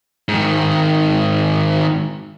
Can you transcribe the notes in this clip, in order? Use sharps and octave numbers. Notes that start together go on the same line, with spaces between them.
G#2 D#3